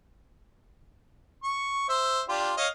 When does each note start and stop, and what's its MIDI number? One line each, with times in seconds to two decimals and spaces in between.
1.43 1.86 85
1.89 2.22 72
1.89 2.22 76
2.29 2.52 62
2.29 2.52 65
2.29 2.52 67
2.57 2.67 73
2.57 2.67 75
2.57 2.67 77